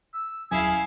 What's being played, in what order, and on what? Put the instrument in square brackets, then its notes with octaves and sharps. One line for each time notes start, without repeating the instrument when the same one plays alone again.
[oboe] E6
[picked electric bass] D#1 F#3 C#4 [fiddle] E4 F5 [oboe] G#4 [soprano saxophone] G#5